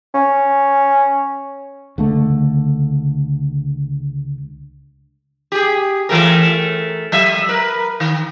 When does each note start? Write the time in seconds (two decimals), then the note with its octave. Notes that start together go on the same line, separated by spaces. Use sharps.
0.14 C#4
1.98 C#2 D3 A3
5.52 G4 G#4
6.09 E3 A3 A#4
7.12 F#3 E5
7.49 A#4 B4
8.00 D#3